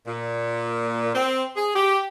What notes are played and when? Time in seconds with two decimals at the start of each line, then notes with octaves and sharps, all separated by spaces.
0.07 A#2
1.15 C4
1.56 G#4
1.75 G4